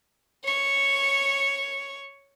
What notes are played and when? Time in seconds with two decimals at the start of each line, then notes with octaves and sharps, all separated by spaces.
0.44 C#5 C#6